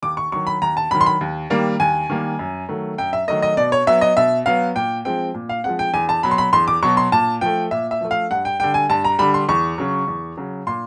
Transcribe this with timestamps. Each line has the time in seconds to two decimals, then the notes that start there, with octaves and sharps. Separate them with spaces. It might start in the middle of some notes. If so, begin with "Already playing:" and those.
0.02 D#2 D6
0.17 C#6
0.32 D#3 F#3 C#6
0.47 B5
0.62 D#2 A#5
0.77 A5
0.91 D#3 F#3 B5
1.01 C6
1.06 B5
1.21 D#2
1.50 D#3 G3 A#3
1.80 D#2 G#5
2.10 D#3 G3 A#3
2.39 F#2
2.69 D#3 F#3 A3
2.98 F#2 G5
3.13 E5
3.28 D#3 F#3 A3 D#5
3.42 D#5
3.57 B2 D5
3.72 C#5
3.87 F#3 B3 E5
4.01 D#5
4.17 B2 E5
4.46 F#3 B3 F5
4.75 A#2 G5
5.05 F3 G#3 C4 G5
5.34 A#2
5.49 F5
5.64 F3 G#3 C4 F#5
5.79 G5
5.94 E2 G#5
6.09 A5
6.23 B2 F#3 B5
6.31 C6
6.38 B5
6.53 E2 C6
6.68 D6
6.83 B2 F#3 C#6
6.97 C6
7.12 A#2 A5
7.41 F3 A3 G5
7.71 A#2 E5
7.91 E5
8.01 F3 A3
8.11 F5
8.31 G2 F#5
8.45 G5
8.60 D3 G3 G5
8.74 G#5
8.90 G2 A5
9.04 A#5
9.19 D3 G3 B5
9.34 C6
9.49 E2 C#6
9.78 C#3 F#3
10.08 E2
10.37 C#3 F#3
10.67 A#2 C6